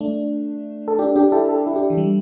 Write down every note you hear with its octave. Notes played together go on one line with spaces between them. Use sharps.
A3 D4
A4
D4 G4
D4 G4
E4 A4
A4
G4
E4
D4 G4
E3
G3